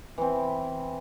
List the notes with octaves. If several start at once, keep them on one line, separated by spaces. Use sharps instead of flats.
E3 C4